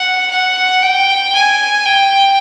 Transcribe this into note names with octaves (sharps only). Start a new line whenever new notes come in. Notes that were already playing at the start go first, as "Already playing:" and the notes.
Already playing: F#5
F#5
G5
G#5
G5